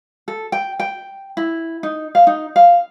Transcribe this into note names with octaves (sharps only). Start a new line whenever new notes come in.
A4
G5
G5
E4
D#4
F5
D#4
F5